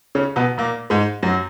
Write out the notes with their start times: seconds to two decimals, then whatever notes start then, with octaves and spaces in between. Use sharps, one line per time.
0.15 C#3 C#4
0.36 B2 B3
0.58 A#2 A#3
0.90 G#2 G#3
1.23 F#2 F#3